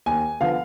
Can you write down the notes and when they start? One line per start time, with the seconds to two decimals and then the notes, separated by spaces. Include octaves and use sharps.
0.06 D#2 G#5
0.40 D3 F3 B3 F5